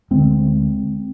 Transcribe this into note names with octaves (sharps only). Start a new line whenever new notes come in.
D2 D3 G#3 C4